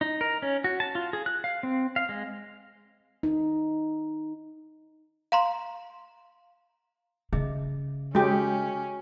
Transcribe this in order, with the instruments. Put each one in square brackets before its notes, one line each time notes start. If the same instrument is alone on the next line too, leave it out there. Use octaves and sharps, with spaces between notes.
[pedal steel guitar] D#4
A#4
C#4
F#4
A5
F4
G#4
F#6
F5
C4
F5
G#3
[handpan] D#4
[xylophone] F5 A#5 C6
[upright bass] C#3 [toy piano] G#4 D#5 E5
[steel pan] G#3 G4 [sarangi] C#4 [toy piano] F#4 C#5